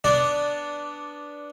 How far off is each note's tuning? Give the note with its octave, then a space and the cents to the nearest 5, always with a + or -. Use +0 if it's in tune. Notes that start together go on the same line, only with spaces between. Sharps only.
B3 +0 D4 +0 D5 -10